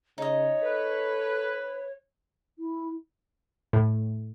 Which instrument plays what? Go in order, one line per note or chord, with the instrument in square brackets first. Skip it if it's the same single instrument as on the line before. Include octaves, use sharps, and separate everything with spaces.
[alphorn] C#3 [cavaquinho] D#4 D#5 [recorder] C#5
[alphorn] A4 [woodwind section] B4
[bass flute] E4
[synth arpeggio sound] A2